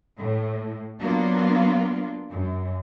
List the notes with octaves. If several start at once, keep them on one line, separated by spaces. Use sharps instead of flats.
A2
F#3 A#3 B3 D4 F4
F#2